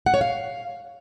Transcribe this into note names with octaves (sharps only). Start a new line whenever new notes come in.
F#5
C#5
F5